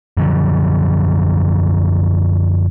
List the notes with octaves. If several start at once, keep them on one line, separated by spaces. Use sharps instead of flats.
F#2 D3 F3